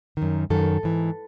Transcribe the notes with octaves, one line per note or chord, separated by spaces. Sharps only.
F#2 D#3
F#2 D#3 A4
G#2 E3